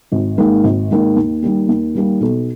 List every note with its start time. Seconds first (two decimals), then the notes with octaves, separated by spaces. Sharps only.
0.12 G#1
0.38 G#2 D#3 A#3
0.64 G#1
0.91 G#2 D#3 A#3
1.16 D#2
1.42 D#3 G3 A#3
1.68 D#2
1.95 D#3 G3 A#3
2.21 B1